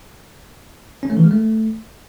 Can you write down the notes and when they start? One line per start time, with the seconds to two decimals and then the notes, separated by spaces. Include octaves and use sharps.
1.03 C#4
1.10 A3
1.17 E3
1.24 G#3
1.31 A3